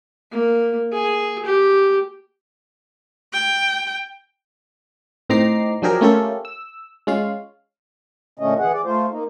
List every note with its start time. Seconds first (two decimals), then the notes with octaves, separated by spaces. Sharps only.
0.32 A#3
0.92 G#4
1.45 G4
3.33 G5
5.29 A2 C4 D#4 A#5 D6 C7
5.82 F3 F#3 D4 G4 G#4 A#4
6.01 A3 A#3 C#4 F4 G4 A4
6.45 E6
7.07 G#3 C#4 F4 F5
8.39 A#2 D3 A3 C#4 D#5
8.59 E3 G#4 F#5
8.73 D5
8.85 A3 F4 C5
9.10 A#3 D#4